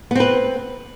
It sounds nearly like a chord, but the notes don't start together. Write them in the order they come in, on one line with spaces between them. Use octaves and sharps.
B3 C4 B4